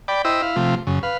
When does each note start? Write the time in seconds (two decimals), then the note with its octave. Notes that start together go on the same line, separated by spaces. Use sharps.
0.08 D5 G5 B5
0.25 E4 C5 D#5 G5 E6
0.42 E4 F5
0.56 C3 F3 A3 F4
0.87 F#2 C#3
1.03 B4 F5